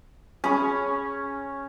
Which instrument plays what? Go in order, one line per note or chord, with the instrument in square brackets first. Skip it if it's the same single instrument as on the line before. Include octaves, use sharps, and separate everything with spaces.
[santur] C#4 [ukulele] G#4 B5